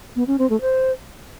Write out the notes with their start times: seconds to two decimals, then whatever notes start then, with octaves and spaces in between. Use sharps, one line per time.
0.16 B3
0.27 C#4
0.39 C4
0.50 A3
0.61 C5